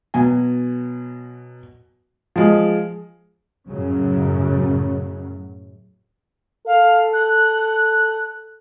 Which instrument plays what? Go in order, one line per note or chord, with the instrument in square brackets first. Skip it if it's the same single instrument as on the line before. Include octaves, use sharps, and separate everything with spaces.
[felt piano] B2 F#3 G#5
F3 G#3
[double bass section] F#2 A2 C#3 F#3
[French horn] A4 [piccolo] F5
[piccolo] F#6